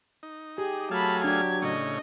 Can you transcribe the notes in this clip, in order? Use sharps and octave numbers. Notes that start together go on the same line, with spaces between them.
D#4
G4 G#4
F#3 A3 G#4 F5 A5 B5
D4 G4 G#6
A2 C#3 C#5 D#5